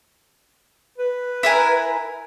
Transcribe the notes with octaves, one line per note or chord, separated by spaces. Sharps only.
B4
E4 A#4 G#5